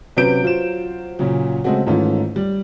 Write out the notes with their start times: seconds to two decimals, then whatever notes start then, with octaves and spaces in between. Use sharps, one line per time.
0.17 C3 F#3 C#4 B4 G6 D7
0.43 F#3 F4 C5 E7
1.19 A#2 C#3 F#3
1.64 C#3 G#3 A3 C4 F#4
1.87 G#2 D#3 E3 A3 C#4 F4
2.36 G3